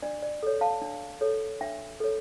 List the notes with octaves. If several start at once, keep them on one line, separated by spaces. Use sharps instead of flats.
D4 D5
D5
A4 C#5
F5 A5
D4
A4 C#5
D4 E5 G5
A4 C#5